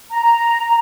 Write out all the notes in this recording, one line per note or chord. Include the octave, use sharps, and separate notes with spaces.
A#5